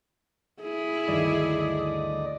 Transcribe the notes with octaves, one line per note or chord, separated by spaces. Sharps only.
E4 G#4
D2 G2 D#3 D5 D#5